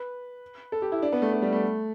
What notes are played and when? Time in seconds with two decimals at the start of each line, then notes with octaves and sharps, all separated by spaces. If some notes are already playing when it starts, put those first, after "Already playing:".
Already playing: B4
0.72 A4
0.82 G4
0.92 E4
1.02 D4
1.12 B3
1.22 A3
1.32 A3
1.42 G3
1.53 A3